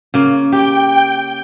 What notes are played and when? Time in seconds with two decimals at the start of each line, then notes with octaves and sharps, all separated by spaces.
0.14 C#3 A#3
0.52 G4 G5